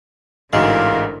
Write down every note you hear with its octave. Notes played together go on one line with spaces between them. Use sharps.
A1 G#2 D3 G#3 E4 F#4 A#4 F5